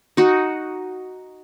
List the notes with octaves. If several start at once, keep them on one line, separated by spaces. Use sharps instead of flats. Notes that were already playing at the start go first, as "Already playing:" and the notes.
D#4 F#4